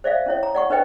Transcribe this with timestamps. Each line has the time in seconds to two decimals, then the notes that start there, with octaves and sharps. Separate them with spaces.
0.04 C5 D5 E5 F5
0.26 C#4 E4 C#5
0.43 A#5
0.55 D5 F#5 C#6
0.70 D4 B4 C5 D#5 G5